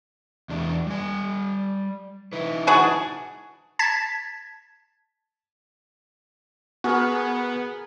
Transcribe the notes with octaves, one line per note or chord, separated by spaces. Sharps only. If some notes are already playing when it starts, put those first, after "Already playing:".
E2 D4
G3 G#5
D#4 E4 B4
D4 F#4 G#4
A5 G#6 A6 B6
B3 F#4 G#4 A#4